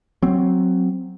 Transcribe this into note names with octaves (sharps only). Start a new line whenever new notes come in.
F#3 C4